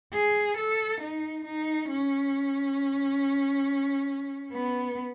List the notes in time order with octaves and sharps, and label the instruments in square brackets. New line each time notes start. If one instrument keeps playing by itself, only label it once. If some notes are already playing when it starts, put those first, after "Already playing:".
[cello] G#4
A4
D#4
D#4
C#4
B3